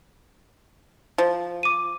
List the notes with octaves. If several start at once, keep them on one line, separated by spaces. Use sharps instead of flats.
F3
D6 D#7